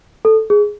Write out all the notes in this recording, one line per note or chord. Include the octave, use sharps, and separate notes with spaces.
A4
G#4